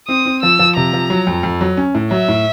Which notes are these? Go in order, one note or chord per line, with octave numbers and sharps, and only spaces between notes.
C4 D#6
C4
F3 E6
F3
C3 A#5
F3
F#3
F2
F2
F#3
C#4
A2
F#3 E5
A2